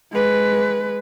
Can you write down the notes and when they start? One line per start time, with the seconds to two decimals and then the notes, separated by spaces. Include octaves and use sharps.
0.12 G#3 B4